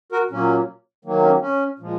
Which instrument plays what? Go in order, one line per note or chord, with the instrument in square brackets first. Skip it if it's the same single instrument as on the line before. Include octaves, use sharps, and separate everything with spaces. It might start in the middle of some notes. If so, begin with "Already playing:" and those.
[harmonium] F#4 A#4
A#2 F#3 A#3 C#4
D#3 F#3 A#3
C#4
C#4
A#2 F3 G#3